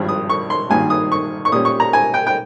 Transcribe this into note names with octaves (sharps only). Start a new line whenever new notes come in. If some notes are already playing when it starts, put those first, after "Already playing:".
Already playing: G#1 G2 F3
D#6
C#6
C6
G#1 G2 D#3 A#3 G#5
D#6
C#6
C#6
A#2 G3 C#4 D#6
C#6
A#5
G#5
G5
G5